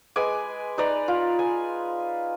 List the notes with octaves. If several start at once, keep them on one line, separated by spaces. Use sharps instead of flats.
G#3 B4 G#5 D6
D#4 B4 D5 A#5
F4
G#5